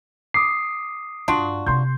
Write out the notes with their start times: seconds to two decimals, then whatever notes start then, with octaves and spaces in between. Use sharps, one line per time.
0.34 D6 D#6 C7
1.28 G2 D4 F4 F#4
1.67 C3 C4 C6 G6